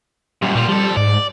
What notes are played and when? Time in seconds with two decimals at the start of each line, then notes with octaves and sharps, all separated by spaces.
0.42 F#2 A#2 G3
0.55 A#2 G3 F4
0.69 F3 G3 A4
0.97 G#2 D5